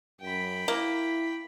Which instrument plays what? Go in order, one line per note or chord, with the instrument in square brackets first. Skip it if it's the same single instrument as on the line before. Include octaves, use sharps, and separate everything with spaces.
[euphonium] F#2 [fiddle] G5 B5
[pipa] A#3 [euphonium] E4